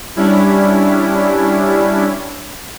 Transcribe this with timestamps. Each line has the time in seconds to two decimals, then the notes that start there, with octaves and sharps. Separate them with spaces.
0.16 G3 C#4 D4 E4